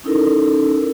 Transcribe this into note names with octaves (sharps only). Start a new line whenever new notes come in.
C#4 D#4 E4 A4 A#4